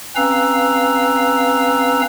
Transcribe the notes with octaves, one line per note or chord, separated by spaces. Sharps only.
C4 C#4 B4 F5 A#5 E6